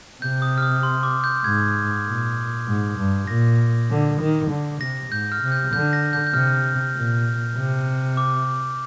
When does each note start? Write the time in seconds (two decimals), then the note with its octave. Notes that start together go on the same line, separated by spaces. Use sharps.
0.22 C3 G6
0.42 D#6
0.58 F6
0.62 D#6
0.83 C6
1.03 D6
1.24 G6
1.44 G#2 G#6
2.06 A#2
2.67 G#2
2.97 G2
3.27 A#2 A#6
3.90 D3
4.20 D#3
4.50 D3
4.81 C3 A#6
5.11 G#2 G6
5.32 F6
5.42 C3
5.52 G6
5.73 D3 G6
5.93 A#6
6.13 G6
6.27 G6
6.34 C3 F6
6.95 A#2
7.56 C3
8.17 D6